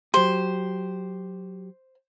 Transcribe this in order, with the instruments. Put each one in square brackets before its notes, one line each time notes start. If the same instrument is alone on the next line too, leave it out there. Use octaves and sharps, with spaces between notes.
[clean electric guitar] F#3 G4 [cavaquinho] C5